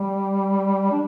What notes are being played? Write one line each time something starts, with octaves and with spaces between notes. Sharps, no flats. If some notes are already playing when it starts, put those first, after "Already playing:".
Already playing: G3
D4